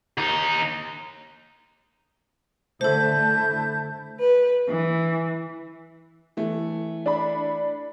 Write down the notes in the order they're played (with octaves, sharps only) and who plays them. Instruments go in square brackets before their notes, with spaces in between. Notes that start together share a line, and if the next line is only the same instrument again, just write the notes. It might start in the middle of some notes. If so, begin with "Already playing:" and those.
[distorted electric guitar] D#2 D#4
[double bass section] D3 A3 [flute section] E4 A5 G6 [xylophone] A4 C5
[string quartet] B4
E3
[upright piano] E3 A3
[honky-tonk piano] D4 B5